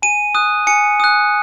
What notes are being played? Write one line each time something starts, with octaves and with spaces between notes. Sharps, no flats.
G#5 D#7
D#6 F#6
G#5 C#7
D#6 F#6